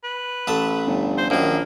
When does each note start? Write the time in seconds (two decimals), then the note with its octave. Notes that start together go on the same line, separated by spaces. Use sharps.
0.04 B4
0.47 A1 A3 A5
0.87 G1
1.18 C5
1.30 A#1 F#2 D#3 A#3